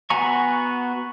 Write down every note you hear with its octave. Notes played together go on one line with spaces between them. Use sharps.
B3 F#4 G#5 A#5 C#6